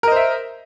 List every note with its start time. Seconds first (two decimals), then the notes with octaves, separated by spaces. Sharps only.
0.03 A#4
0.08 D#5
0.12 C5
0.16 E5